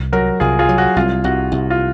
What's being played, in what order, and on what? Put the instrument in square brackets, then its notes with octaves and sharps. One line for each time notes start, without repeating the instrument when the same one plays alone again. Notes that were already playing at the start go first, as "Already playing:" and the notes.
Already playing: [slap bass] C2
[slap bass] F#3 [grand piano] F#4 A#4
[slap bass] C2 [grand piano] F4 G#4
[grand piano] F4 G#4
[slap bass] F#3
[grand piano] F#4
[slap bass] C2 [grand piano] F4
[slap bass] C2 [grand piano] F#4
[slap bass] C2
[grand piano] F4